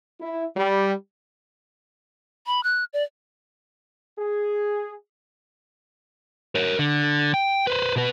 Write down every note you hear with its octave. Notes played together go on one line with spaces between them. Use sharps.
E4
G3
B5
F#6
D5
G#4
A#4 C#5
D3
G5
B4 C5
B2 B4